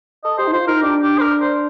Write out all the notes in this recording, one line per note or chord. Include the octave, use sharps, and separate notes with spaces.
A4 D#5
G4 C5
D#4
F4 C5
D#4 A#4
D4 G4
G4
C5
A#4
C5